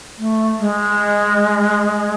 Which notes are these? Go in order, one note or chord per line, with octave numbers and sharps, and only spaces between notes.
A3
G#3